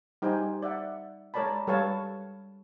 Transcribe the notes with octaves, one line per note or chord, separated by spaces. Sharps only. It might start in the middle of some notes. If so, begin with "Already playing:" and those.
G3 D#4 G4 C5 G5 G#5
D5 E5 F#5
G#3 A#4 C#5 D5 A5 B5
G3 A4 B4 C#5 F5 A5